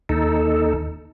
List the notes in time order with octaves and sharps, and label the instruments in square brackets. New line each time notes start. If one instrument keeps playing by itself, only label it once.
[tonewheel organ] D#2 D#4 A4